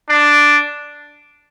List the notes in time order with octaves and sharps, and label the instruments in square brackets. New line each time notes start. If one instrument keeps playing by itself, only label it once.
[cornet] D4